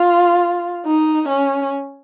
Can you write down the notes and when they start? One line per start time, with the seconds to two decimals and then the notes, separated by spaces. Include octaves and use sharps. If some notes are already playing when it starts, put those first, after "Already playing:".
Already playing: F4
0.86 D#4
1.28 C#4